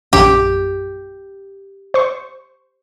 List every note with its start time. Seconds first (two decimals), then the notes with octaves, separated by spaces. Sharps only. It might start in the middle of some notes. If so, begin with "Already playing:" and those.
0.13 A#1 F#2 G4 D6
1.94 C5 C#6